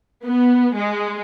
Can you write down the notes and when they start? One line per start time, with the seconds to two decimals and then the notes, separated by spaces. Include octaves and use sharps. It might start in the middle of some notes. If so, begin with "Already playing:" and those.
0.24 B3
0.75 G#3